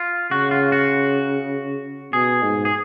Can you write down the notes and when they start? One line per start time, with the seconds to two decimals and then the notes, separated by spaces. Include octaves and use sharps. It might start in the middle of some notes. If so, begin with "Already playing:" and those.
Already playing: F4
0.31 C#3 F#4
0.51 F4
0.72 F#4
2.13 B2 G#4
2.43 G#2
2.65 G#4